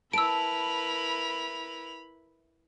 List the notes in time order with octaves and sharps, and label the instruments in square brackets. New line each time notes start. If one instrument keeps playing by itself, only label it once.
[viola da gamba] E4 A#4 B4 [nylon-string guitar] A5 [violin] B5 F7 [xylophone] E6 D7